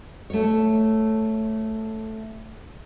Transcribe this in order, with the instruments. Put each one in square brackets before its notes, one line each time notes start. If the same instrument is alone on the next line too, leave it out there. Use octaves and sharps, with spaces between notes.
[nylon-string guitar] A3 C#5